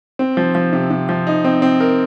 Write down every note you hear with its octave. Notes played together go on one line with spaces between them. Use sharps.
C4
F3
F3
C3
C3
F3
D#4
C4
C4
A#4